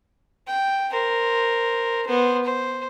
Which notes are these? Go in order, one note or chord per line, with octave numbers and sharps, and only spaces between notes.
G5
A#4 C5
B3 C5
C5